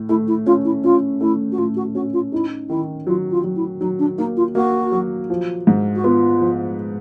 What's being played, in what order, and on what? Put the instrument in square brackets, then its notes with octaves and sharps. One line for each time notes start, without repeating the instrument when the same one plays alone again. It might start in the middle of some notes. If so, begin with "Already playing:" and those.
Already playing: [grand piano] A2
[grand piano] A3 [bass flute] E4
[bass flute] E4
[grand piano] C#4 [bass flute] F4
[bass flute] E4
[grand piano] C#4 [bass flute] F4
[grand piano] A3 [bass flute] E4
[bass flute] F#4
[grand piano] A2 [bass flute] F4
[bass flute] F#4
[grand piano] C#4 [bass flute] F#4
[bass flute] F4
[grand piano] D#4 [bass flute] E4
[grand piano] D#3 [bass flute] E4
[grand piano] F#3 [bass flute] F4
[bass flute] F4
[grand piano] F#3
[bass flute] E4
[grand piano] F#3 [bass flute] D#4
[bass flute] D4
[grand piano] A#3 [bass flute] D#4
[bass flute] F4
[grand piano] A#3 [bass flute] F#4
[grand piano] F#3
F3
G#2
[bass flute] F#4
[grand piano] B3 [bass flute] F4
[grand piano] F3